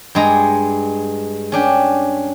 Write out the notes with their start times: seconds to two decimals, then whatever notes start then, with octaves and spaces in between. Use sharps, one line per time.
0.15 G2 G#3 A#5
1.52 C#4 D4 G4